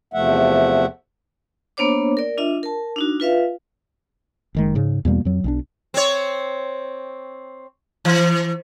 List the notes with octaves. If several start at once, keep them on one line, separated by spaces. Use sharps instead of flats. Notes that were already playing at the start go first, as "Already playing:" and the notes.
E2 C3 F3 A3 E5 F#5
A#3 B3 D4 C5 C#5 D6
A#4 D5
D4 F4 D#5 E5
A#4 A5
D4 D#4 F#4
F4 B4 E5 F5
F#1 D#3 G#3
G#2 C#3
E2 B2 G3 A#3
F2 F#3
B1 G3 D4
C4 C#5
E3